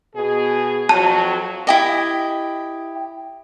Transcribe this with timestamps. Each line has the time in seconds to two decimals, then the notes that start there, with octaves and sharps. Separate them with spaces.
0.15 B2 G#4
0.89 F2 F#3 A5
1.67 E4 G4 D#5